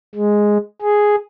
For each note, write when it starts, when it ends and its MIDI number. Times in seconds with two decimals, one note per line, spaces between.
0.15 0.57 56
0.82 1.15 68